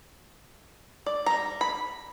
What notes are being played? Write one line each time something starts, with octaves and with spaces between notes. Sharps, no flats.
D5
G3 A#5
B5